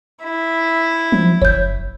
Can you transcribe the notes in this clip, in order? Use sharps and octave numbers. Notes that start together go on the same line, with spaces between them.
E4
F3
F#1 C#5 G6